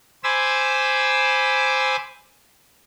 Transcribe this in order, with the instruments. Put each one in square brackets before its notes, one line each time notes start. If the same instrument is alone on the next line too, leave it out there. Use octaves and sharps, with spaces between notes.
[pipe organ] C5 G#5 B5 D6 E6